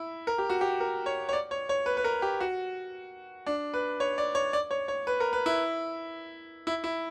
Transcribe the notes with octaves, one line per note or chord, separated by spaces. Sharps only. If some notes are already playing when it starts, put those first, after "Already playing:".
Already playing: E4
A#4
G4
F#4
G4
A#4
C#5
C#5
D5
C#5
C#5
B4
B4
A#4
G4
F#4
D4
B4
C#5
D5
C#5
D5
C#5
C#5
B4
A#4
B4
E4
E4
E4